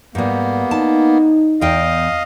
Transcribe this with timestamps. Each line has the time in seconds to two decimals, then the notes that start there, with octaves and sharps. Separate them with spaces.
0.15 G#2 G3 A#3 B3
0.71 D#4 A5
1.61 E2 D#5 F5 G5